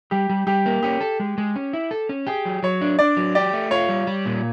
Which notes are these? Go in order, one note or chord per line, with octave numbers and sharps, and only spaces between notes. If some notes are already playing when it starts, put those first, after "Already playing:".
G3 G4
G3
G3 G4
A#3
C#4 G4
A4
G#3
G#3
C#4
E4
A4
C#4
G4 G#4
F#3
F#3 C#5
D4
D4 D5
F#3
G4 D5
A3
F4 C#5
G3
G3
A#2